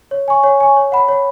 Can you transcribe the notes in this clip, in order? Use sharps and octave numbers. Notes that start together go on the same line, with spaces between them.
C#5
G#5 C#6
C#5
G#5 C#6
C#5
F#5 B5
C#5